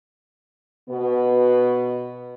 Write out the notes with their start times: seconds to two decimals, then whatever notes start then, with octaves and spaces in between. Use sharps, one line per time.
0.89 B2 B3